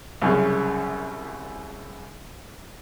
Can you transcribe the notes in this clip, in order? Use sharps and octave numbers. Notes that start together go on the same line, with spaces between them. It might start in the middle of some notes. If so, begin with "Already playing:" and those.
C2 F#2 C#3